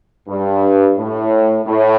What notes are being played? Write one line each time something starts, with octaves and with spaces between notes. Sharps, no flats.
G2
A2
A2